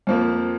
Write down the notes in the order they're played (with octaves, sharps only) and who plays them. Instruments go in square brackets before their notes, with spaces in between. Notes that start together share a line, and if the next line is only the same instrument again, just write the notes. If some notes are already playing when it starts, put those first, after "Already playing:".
[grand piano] F2 F3 A#3